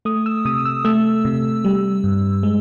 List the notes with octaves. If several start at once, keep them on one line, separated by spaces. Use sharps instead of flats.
A3 D#6
E6
C3 D#6
E6
A3 E6
C3
G3
G2
G#3